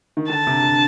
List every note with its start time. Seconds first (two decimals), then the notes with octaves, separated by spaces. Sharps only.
0.17 D#3
0.29 D3 A5
0.47 C3
0.63 D3